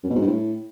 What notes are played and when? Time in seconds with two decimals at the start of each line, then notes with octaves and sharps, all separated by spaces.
0.04 F#2
0.10 B2
0.15 G#2
0.21 G2
0.27 A2